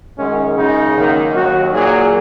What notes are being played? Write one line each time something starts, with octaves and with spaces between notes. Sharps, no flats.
F#2 D#3 G#3 C#4
F#2 C#3 G#3 D#4
F#2 D#3 A#3
D#2 D#3 F#3 F#4
A#2 F#3 A#3 G#4